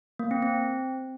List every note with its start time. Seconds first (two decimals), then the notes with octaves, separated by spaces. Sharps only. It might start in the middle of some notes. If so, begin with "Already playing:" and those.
0.19 A#3
0.31 C4
0.42 C4